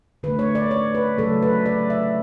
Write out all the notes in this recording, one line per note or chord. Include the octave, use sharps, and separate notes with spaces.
D3 A3 B4
C#5
D5
C#5
B4
C#3 F#3 A3 A4
B4
D5
E5